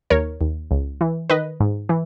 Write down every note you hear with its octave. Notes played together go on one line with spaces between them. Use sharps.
D#2 A#4 C#5
D#2
C#2
E3
D#3 B4 D#5
G#2
E3